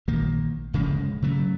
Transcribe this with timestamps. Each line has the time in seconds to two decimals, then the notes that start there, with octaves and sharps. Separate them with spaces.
0.08 A#1 D#3 A#3
0.73 D1 C#3 F3 G#3
1.22 C#3 F#3 A3